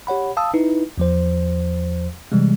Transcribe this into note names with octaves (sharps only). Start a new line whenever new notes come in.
G4 C#5 F#5 B5
F5 A5 D#6 E6
D#4 E4 B4
E2 F3 C5
C3 E3 G3 G#3